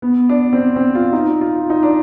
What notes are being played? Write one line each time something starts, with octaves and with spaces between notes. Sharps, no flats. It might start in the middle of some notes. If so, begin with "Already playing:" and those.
B3
D4
C4
D4
C4
F4
D#4
F4
D#4
D4